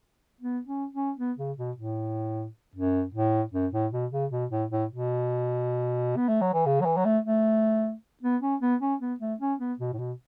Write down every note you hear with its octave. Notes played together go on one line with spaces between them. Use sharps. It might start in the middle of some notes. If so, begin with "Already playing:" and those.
B3
C#4
C#4
B3
C#3
B2
A2
F#2
A2
F#2
A2
B2
C#3
B2
A2
A2
B2
B3
A3
F#3
E3
C#3
F#3
E3
F#3
A3
A3
B3
C#4
B3
C#4
B3
A3
C#4
B3
B2
A2
B2